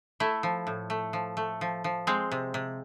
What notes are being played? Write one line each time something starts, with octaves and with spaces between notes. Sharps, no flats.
A3 E4
F3
A2
A3
F3
A3
F3
F3
G#3 C4
C3
C3